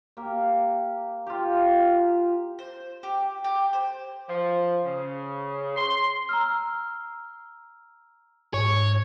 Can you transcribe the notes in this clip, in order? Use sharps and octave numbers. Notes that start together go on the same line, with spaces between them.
A#3 G4 A#4
F4 G4
C5
G4
G4
C5
F3
C#3
C6
A#5 E6 F6
G#2 C#5